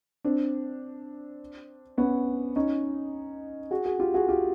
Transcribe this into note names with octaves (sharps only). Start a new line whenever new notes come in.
C4 D4
B3 C#4
C#4 D#4
F#4 G#4
F#4 G#4
F4 G4
F#4 G#4
F4 G4